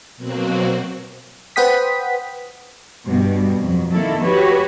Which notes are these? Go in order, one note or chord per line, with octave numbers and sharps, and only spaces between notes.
B2 F#3 A#3 C4 F#4
B4 C5 F#5 G5 D#6 B6
G2 B2 G3
F2 F#3
D#3 A#3 E4 A4
F#4 G4 B4 C#5